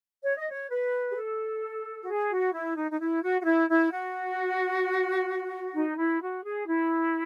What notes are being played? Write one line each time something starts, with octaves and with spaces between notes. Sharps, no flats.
C#5
D#5
C#5
B4
G#4
A4
F#4
G#4
F#4
E4
D#4
D#4
E4
F#4
F#4
E4
E4
F#4
D#4
E4
F#4
G#4
E4